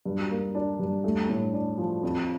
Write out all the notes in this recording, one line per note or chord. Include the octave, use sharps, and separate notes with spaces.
G2
A#3
D4
G2
A3
A2
D4
F3
F2